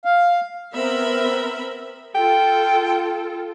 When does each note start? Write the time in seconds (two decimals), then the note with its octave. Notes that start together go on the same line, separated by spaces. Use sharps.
0.05 F5
0.74 B3 C4 A#4 E5 B5
2.15 F4 A4 G5